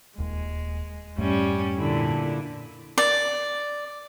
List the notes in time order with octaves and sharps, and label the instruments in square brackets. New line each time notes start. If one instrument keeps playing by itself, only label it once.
[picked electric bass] D#1 D#2 [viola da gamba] G#3
[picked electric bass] F2 G#2 A3 [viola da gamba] G3 C#4
[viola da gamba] A#2 D3 E4
[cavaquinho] D5